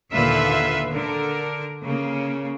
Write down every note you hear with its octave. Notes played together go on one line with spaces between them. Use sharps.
D#2 A#2 D3 F4 B4 E5
D3 A#4
C#3 A#3